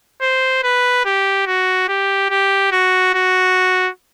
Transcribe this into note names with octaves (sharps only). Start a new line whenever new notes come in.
C5
B4
G4
F#4
G4
G4
F#4
F#4